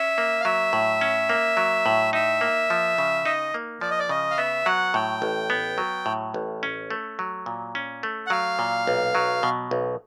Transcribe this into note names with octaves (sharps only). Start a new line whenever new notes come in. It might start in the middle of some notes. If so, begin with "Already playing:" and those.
Already playing: C#4 E5
A#3
F5
F#3 E5
A2
C#4
A#3
F#3
A2
D#4 E5
A#3
F3
C#3
D#4 D#5
A#3
F3 D5
D#5
D5
C#3 D#5
F5
B3 E5
F#3 F#5
A2 G5
A1
B3
F#3
A2
A1
C#4
A3
F#3
A#2
C#4
A3
F#5
F#3 F5
A#2
B1
F#3
B2
B1